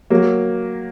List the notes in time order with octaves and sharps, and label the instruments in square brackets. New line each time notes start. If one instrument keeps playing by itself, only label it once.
[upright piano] F#3 A#3